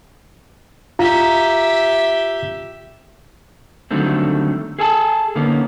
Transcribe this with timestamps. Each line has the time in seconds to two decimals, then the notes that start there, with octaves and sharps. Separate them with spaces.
0.99 F4 G4 E5 A#5
3.91 D3 D#3 F#3 G3 A3 C4
4.79 G#4 A4 G#5 A5
5.35 D3 D#3 A#3 B3 C#4